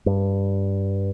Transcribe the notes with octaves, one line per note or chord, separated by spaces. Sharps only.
G2